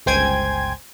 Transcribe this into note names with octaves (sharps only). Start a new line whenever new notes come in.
G1 C#2 C5 G5 G#5 G#6